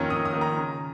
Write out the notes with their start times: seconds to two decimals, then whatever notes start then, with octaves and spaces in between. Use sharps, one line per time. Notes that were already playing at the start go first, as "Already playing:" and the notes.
Already playing: F2 D#3 A#3 C#4
0.10 F2 D#6
0.25 D#6
0.33 D#3 A#3 C#4
0.41 A#5
0.57 C#3